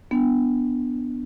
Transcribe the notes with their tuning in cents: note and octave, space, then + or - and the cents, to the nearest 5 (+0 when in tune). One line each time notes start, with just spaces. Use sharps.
B3 +0 D4 +0